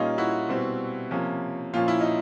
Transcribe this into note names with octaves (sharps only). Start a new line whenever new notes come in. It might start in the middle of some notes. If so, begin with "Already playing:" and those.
Already playing: A#2 G3 A#3 C#4 D#4 F4
E4 F#4
B2 G3 C4
C3 F3 A#3 C#4
A#2 F3 A#3 C#4 F4
E4
D#4